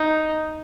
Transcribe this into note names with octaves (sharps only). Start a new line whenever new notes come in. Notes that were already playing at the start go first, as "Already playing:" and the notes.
Already playing: D#4